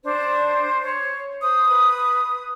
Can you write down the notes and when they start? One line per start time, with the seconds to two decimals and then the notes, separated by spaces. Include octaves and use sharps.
0.04 D4 C5
0.82 C#5
1.41 C5 D#6
1.69 B4